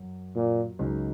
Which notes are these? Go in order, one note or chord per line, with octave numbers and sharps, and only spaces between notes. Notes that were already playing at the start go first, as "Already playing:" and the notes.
Already playing: F#2 F#3
A#2
C#2 C#3 F#3 D#4